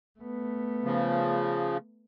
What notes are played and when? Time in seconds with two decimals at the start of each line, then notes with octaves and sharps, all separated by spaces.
0.20 A3 B3
0.84 C#3 F3